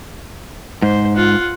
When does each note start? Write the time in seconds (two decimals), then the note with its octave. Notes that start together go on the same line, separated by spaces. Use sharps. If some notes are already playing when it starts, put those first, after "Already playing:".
0.82 G#2 C5
1.16 F4 F#5